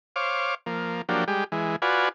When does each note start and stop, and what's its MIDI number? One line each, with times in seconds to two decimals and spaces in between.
0.16 0.55 72
0.16 0.55 73
0.16 0.55 77
0.16 0.55 86
0.66 1.02 53
0.66 1.02 58
1.09 1.24 53
1.09 1.24 54
1.09 1.24 58
1.09 1.24 62
1.09 1.24 67
1.28 1.44 55
1.28 1.44 56
1.28 1.44 67
1.52 1.76 52
1.52 1.76 56
1.82 2.09 65
1.82 2.09 66
1.82 2.09 71
1.82 2.09 74
1.82 2.09 80